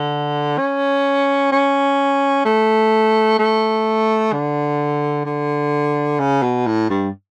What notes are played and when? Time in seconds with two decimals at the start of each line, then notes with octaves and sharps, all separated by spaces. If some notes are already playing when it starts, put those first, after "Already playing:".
Already playing: D3
0.58 C#4
1.52 C#4
2.45 A3
3.39 A3
4.33 D3
5.25 D3
6.20 C#3
6.42 B2
6.67 A2
6.90 G2